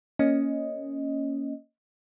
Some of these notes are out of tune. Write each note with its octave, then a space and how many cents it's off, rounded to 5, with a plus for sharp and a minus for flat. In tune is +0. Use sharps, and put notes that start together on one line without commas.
A#3 +0 C#4 +0 D#5 +0